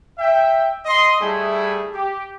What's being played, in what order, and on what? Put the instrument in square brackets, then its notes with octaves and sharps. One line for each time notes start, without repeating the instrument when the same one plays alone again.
[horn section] E5 G5
D#5 C6
G3 A3 E4 G#4
G4